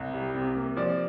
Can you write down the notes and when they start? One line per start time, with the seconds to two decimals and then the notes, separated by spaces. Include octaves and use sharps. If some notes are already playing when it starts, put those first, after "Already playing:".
Already playing: C2
0.14 G3
0.35 C3
0.56 A#3
0.77 F3 D5